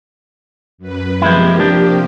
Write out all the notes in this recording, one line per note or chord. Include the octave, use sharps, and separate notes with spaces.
F#2 B4
C3 F3 G#3 A#3 E4 G4
F3 D4